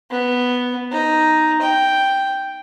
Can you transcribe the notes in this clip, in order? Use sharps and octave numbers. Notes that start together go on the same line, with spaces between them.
B3
D#4
G5